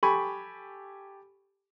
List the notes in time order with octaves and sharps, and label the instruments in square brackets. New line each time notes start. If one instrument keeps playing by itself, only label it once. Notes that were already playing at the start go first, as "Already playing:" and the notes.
[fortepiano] G4 A4 G#5 B5 C#6